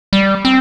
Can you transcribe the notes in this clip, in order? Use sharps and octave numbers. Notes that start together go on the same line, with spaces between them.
G3
C4